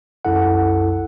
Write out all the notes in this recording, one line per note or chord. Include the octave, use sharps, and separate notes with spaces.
C2 F#2 E4 A4 F#5